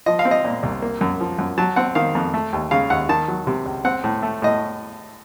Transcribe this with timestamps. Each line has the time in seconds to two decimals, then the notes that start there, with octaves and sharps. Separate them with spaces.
0.06 F3 D#5
0.19 F5
0.25 C4
0.31 D#5
0.45 A#2
0.63 C2
0.82 A#3
1.01 F#2
1.20 F3
1.38 F#2
1.58 F#3 A5
1.76 C4 F#5
1.95 D#3 F5
2.15 F2
2.34 A3
2.53 D#2
2.71 C#3 F5
2.90 D#2 F#5
3.09 D#3 A5
3.28 F#3
3.47 C3
3.66 C#2
3.85 C4 F#5
4.04 A2
4.23 A3
4.42 A2 D#5